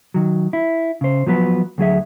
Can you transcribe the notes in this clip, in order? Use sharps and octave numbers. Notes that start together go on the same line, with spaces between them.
D#3 F#3
E4
C#3 C5
F3 F#3 B3 B4
D2 F#3 G#4 E5